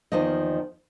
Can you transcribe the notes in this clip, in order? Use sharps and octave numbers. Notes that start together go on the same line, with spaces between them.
E2 D#3 F3 A#3 D#5